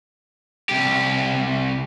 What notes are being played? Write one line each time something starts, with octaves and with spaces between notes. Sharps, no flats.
C2 G4